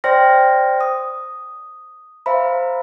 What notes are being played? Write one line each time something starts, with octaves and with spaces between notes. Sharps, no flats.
C5 D5 G5 C6 F6 A#6
D#6
C5 E5 F5 A#5 B5